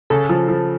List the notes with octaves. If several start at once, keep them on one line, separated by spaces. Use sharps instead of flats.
C#3 A4
F3
F3